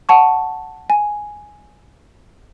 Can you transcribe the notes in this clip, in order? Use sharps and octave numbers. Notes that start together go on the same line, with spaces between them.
F#5 A5 C#6
G#5